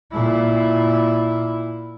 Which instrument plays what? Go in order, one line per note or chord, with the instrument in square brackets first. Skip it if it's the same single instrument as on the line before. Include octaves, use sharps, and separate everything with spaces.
[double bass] A#2 E4